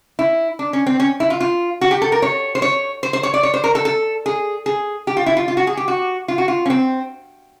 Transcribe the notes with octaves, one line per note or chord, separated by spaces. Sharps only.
E4
D4
C#4
C4
C#4
E4
F4
F4
F#4
G4
A4
A#4
C#5
C5
C#5
C5
C5
C#5
D5
C#5
C5
A#4
A4
A4
G#4
G#4
G4
F4
E4
F4
F4
F#4
G#4
G4
F#4
F4
F#4
F4
C#4
C4